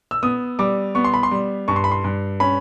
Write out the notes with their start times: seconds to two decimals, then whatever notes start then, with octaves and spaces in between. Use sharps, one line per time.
0.11 E6
0.23 B3 D#6
0.59 G3 D6
0.95 B3 C#6
1.04 C6
1.14 B5
1.23 C6
1.31 G3
1.68 G2 C#6
1.76 C6
1.84 B5
1.92 C6
2.04 G2
2.40 C#4 B5